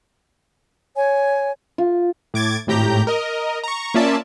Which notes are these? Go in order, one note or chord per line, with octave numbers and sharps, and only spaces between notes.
C#5 G#5
F4
A2 D6 G#6 A6
G#1 A2 G4 A#5 G6
A#4 D#5
A#5 C#6
A#3 C#4 F4 D5 E5 A5